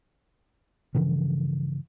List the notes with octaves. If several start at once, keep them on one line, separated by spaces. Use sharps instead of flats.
G2 C#3 E3 F3